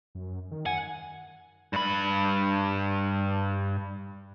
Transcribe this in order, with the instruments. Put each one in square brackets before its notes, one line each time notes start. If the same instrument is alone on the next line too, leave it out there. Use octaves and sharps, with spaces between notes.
[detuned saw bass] F#2
D#3
[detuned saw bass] F#2 [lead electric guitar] F#5 [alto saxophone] G#5
[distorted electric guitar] G2 B5